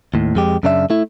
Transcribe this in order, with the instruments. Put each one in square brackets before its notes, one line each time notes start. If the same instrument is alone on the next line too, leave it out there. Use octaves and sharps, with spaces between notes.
[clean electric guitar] D#2 A2
F2 G#3 G4
F#2 C#3 D4 A4 E5
A3 E4